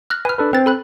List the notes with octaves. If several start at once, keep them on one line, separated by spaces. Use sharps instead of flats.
F6 F#6 A#6
B4 G#5 F6
D4 A4 B4
C4 B4 A6
A4 B5 F#6